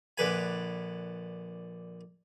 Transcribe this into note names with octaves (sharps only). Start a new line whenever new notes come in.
A#1 D3 B4 G#5